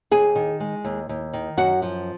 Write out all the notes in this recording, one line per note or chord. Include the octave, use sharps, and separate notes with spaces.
D#2 G#4 G#5
D#3
G#3
D#2
D#2
D#3
F#2 F#4 F#5
F3